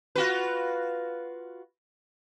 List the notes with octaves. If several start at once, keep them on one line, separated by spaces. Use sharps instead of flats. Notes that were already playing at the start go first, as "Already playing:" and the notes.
F4 F#4 B4